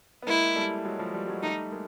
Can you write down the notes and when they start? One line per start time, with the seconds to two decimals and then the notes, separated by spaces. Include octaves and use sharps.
0.22 B3
0.27 G#3 A#3 E4
0.55 G3 A3
0.85 F#3 G#3
0.99 F3 G3
1.14 F3 G3
1.28 F#3 G#3
1.43 G3 A3 D#4
1.72 G#3 A#3